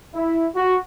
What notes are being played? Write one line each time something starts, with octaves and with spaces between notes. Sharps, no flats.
E4
F#4